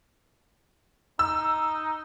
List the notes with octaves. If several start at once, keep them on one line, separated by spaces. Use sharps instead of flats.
D#4 E6